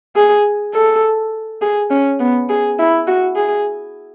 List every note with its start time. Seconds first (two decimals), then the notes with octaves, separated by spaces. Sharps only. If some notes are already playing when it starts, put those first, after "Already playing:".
0.16 G#4
0.74 A4
1.62 G#4
1.91 C#4
2.20 B3
2.49 G#4
2.79 E4
3.07 F#4
3.36 G#4